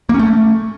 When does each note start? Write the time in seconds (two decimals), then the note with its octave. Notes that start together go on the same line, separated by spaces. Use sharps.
0.09 A#3
0.14 C#4
0.19 A3